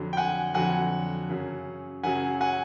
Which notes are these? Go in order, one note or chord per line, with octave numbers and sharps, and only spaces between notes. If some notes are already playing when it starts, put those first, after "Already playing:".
Already playing: F2 D3 F#3
G5
F#5 G#5
F2 D3 F#3 F#5 G#5
F#2 C#3 F#3
F#2 C#3 F#3 F#5 G#5
F#5 G#5